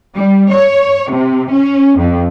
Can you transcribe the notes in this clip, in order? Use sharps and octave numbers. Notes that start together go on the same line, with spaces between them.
G3
C#5
C3
C#4
F2